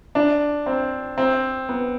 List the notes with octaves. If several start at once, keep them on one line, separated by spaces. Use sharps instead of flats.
D4
C4
C4
B3